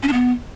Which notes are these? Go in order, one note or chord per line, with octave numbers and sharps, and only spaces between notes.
C#4
D4
B3